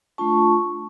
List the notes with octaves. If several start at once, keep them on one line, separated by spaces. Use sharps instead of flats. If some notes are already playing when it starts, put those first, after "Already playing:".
A3 D4 F4 A5 C#6